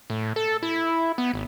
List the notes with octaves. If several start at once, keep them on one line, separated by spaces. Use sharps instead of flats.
A2
A4
E4
B3
G#1